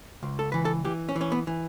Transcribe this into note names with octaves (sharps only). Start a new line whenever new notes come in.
C#2
A4
E3 B4
A4
E3 G4
C#4
E3
C#4
B3
E3